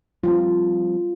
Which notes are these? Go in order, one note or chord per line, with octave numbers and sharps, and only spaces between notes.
F3 G3 C4 F4